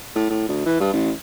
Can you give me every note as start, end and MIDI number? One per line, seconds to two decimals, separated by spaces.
0.16 0.25 45
0.30 0.48 45
0.49 0.62 38
0.66 0.76 52
0.80 0.90 43
0.93 1.11 33